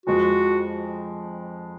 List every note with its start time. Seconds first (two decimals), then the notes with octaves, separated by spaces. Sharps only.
0.06 F2 F3 G#3 F#4